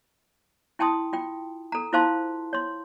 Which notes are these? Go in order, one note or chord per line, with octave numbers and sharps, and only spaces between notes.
E4 G5 A5 C6 D#6
F4 G5
A4 A#5
E4 F4 C5 F5 A5 C6
C#5 C6